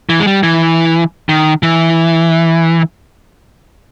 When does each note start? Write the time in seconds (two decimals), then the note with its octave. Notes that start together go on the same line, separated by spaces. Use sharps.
0.09 E3
0.20 G#3
0.27 G3
0.43 E3
1.29 D#3
1.63 E3